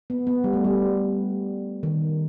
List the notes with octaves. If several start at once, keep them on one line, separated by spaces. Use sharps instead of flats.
B3
B3
G3
A3
G3
D#3